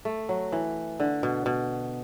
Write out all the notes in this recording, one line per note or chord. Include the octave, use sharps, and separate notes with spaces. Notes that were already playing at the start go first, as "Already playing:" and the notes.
A3
F#3
E3
D3
B2
B2